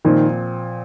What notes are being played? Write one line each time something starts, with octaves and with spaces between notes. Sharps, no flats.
A#2 D#3 F3 C4